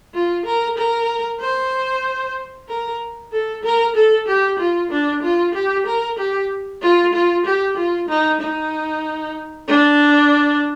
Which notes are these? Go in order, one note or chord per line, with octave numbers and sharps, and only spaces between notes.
F4
A#4
A#4
C5
A#4
A4
A#4
A4
G4
F4
D4
F4
G4
A#4
G4
F4
F4
G4
F4
D#4
D#4
D4